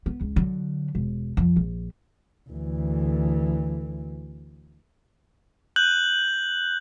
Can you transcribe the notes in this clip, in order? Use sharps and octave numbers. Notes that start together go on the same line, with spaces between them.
B3
C#2
D3 F#3
E1
F2
A#1
D2 E3
F#6 G6 F#7